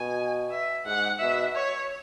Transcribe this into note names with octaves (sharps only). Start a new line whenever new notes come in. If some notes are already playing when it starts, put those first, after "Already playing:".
Already playing: B2 G#5
E5
G#2 F#5
B2 E5
C#5